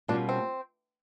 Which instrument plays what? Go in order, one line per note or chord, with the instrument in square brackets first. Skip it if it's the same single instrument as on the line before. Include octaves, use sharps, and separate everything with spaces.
[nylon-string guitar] B2 G3 A#3 C#4 F4 [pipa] D4
[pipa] C4